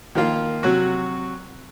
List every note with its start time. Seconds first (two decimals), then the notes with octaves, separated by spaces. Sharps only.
0.15 D#3 F3 A#3 F4
0.63 C3 F#3 F#4